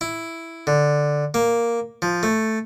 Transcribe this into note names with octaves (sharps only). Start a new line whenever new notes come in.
E4
D3
A#3
F3
A3